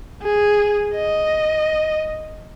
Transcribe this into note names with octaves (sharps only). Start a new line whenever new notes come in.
G#4
D#5